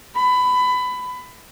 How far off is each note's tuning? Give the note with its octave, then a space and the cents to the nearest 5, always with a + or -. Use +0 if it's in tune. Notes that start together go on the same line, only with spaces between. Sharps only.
B5 +20